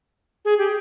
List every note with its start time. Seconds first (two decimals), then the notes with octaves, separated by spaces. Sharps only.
0.45 G#4
0.58 G4